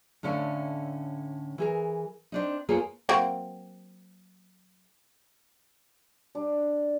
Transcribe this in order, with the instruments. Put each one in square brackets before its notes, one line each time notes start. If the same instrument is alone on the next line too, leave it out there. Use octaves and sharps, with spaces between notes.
[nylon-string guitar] A2 D3 C#4 E4 F5
E3 G#4 A#4
C4 D4 D#4
A#3 B3 F4 G#4 A4 C#5
[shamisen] F#3 A#3 C4
[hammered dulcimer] G3 D4